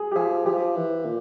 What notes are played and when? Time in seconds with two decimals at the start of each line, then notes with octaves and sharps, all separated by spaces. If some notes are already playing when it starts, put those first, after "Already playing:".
Already playing: G#4
0.12 G4
0.15 F3 G#4
0.46 F3 G4
0.76 E3
1.05 A#2